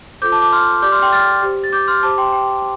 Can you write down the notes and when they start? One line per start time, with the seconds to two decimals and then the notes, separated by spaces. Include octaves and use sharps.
0.22 F4 A4 C5 D6 G6
0.32 A5 D6
0.42 A5 D6
0.52 C6 F6
0.82 G4 D5 D6 G6
0.92 C6 F6
1.02 G5 C6
1.12 F6 A6
1.43 G4 C5
1.64 A6
1.72 D6 G6
1.88 C6 F6
2.03 G4 C5 A5 D6
2.18 G5 C6
2.33 G5